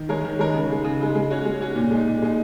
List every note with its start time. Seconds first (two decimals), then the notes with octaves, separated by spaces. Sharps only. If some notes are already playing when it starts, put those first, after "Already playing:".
Already playing: D#3
0.09 G#3 D#4 A#4 C#5
0.25 D#3
0.39 G#3 D#4 A#4 C#5
0.54 C#3
0.70 G#3 D#4
0.84 C#3
1.01 G#3 D#4
1.15 G#3
1.30 C#4 F#4 C#5
1.45 G#3
1.60 C#4 F#4 C#5
1.76 A#2
1.91 G#3 D#4
2.07 A#2
2.22 G#3 D#4